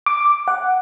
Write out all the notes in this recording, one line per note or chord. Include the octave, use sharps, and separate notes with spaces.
D6
F#5